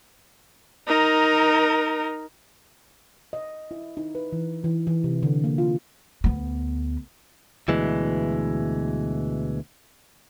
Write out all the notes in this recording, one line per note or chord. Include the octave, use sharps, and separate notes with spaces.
D#4 A#4
D#5
E4
D#4
B4
E3
E3
E3
C3
D3
A#3
F4
D2 B3
D2 B2 E3 G#3